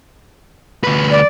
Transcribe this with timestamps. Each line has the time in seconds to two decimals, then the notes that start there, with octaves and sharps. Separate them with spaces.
0.84 D2 B4
1.11 D5